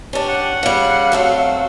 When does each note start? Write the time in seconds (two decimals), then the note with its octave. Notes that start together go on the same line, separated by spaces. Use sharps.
0.13 C#4 D4 G4
0.29 F#5
0.63 C#3 G3 F5
1.12 F#3 A3 C4